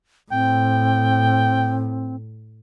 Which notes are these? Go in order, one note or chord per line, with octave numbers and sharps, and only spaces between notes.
A2 C4 G5